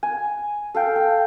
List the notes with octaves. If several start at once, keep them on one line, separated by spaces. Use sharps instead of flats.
G#5
A4 F5 G5
G5